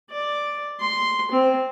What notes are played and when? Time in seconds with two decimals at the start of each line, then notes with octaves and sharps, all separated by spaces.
0.10 D5
0.80 C6
1.31 C4